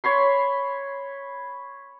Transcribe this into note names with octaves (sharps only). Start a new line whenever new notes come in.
C#5 B5 C6